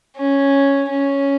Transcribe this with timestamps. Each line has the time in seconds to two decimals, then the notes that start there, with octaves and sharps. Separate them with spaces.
0.17 C#4
0.89 C#4